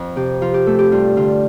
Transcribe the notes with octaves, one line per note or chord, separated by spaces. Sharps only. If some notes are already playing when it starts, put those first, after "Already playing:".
Already playing: F2
C3 G4
F3 F4
G4
A3 A4
G4
G2 F4
D3 F4